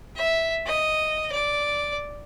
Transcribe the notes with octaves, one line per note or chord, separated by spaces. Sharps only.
E5
D#5
D5